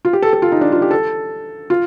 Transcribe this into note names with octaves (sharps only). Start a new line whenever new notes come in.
F4
G4
A4
A4
F4
D#4
D4
F4
G4
A4
F4